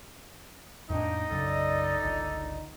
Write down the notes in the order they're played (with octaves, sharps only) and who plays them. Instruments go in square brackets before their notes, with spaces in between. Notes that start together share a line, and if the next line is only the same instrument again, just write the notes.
[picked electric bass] F2 A2 D4 [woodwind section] A#3 G5 [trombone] D#4 [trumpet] D#5
[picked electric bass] B1 F#2 C#3 [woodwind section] A4 D5
[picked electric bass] G1 C#2 D3